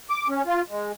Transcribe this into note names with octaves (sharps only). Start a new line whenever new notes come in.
D6
C#4
F4
G#3